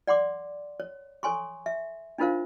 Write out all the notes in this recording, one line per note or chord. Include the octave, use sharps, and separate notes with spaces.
D5 F#5 C6 D6
C#5
A4 C#5 G#5 C6 C#6
E5
D4 D#4 F4 A#4 C5 F5